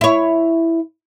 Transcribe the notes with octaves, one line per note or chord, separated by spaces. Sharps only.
E4 C#5